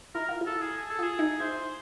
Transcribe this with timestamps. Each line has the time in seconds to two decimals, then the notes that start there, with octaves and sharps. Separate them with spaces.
0.15 E4 A#4
0.29 F4
0.41 E4
0.47 A4
0.62 G#4
0.78 G#4
0.90 A4
0.99 F4 G#4
1.19 D#4
1.40 E4 C5